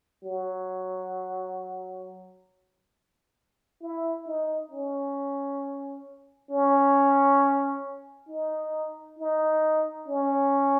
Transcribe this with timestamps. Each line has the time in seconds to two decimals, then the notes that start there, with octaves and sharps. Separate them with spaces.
0.24 F#3
3.82 E4
4.26 D#4
4.71 C#4
6.51 C#4
8.29 D#4
9.19 D#4
10.08 C#4